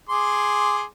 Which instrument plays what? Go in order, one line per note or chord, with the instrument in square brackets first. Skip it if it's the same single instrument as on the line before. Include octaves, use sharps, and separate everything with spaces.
[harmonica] G#4 C6 D6